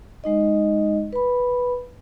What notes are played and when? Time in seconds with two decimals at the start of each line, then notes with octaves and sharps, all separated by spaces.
0.24 G#3 D#4 D#5
1.13 B4 B5